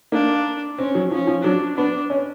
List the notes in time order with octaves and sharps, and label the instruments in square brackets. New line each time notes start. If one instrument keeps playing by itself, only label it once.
[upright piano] A#3 [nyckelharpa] D4
[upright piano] C4 [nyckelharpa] C#4
[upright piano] F#3
[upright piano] F3 [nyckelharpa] C#4
[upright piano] F3
[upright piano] F#3 [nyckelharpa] D4
[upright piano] B3 [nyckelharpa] D4
[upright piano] C#4